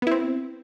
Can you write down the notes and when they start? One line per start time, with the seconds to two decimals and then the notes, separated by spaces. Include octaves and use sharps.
0.02 B3
0.07 E4
0.11 C4